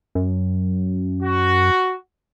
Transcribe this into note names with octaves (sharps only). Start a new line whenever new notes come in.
F#2
F#4